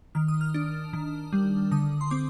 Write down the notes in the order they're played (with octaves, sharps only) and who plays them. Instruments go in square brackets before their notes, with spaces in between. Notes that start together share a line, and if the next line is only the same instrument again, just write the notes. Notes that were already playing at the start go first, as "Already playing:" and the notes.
[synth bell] D#3 F6
D#6
F6
D4
D#3
G3
D3 D#6
C6
C4 D6